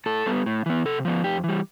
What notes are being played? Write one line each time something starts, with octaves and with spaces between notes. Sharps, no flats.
A2 A4
G3 B3
A2
E3 B3
C3 A4
F3 B3
F2 G4
E3 G3